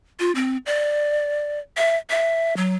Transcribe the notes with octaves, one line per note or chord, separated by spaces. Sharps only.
F4
C4
D5
E5
E5
F#3